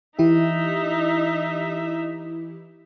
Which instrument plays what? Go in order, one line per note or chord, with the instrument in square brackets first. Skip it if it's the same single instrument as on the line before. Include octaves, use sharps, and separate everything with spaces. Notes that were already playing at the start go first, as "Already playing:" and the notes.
[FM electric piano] E3 E4 G4 [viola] D#4 E5